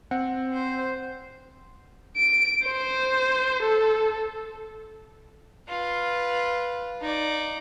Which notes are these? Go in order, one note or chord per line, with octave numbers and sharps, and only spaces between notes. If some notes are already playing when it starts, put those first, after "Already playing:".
C4 F#5
C5
D7
C5
A4
F4 B4
D#4 D5